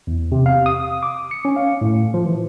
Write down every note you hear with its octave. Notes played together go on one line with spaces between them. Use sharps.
E2
C3
F5
D#6
D6
C#7
C#4
F5
A2
F3
E3